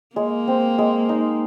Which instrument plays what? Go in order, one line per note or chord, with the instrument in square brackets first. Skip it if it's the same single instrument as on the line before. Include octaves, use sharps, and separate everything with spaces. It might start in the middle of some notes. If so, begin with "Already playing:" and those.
[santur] G#3 [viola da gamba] A#3
[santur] C4
G#3
D#4